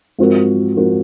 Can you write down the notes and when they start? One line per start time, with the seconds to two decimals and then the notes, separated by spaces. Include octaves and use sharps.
0.19 G#2 F3 C4 F#4 A#4
0.77 G#2 F3 C4 F#4 A#4